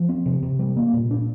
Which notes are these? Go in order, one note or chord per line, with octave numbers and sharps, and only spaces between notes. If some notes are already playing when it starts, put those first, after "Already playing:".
Already playing: F3
C4
C3
C3
G3
A#3
A#2
D4